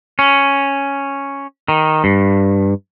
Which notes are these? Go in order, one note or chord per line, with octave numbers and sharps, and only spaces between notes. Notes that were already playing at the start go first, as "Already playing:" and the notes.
C#4
D#3
G2